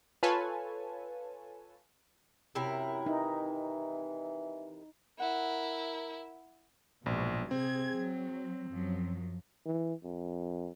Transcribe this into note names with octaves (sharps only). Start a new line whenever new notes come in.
F4 A4 B4 C#5 G#5 A5
F#2 C3 E4 A#4
E3 D#4
E4 A#4 F#5
A#1 G#2 B2 F#3
C3 C4 G#4 G#6
F#3
F#2 F3 F#3
E3
F2